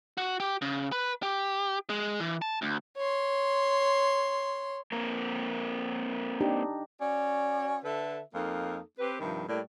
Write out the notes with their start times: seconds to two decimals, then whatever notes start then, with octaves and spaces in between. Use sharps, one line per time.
0.18 F#4
0.40 G4
0.62 C#3
0.92 B4
1.23 G4
1.90 G#3
2.20 E3
2.42 A5
2.62 D2
2.97 C#5 C6
4.92 A#3 C4 A#4
6.41 D4 D#4 G4
7.01 C#4 F#4 D5
7.84 D3 A4 B4 E5
8.34 F2 A#3 D#4 A4
8.99 C4 G4 B4
9.19 G2 C3 D#3 F3
9.48 A2 G3 A#3 D5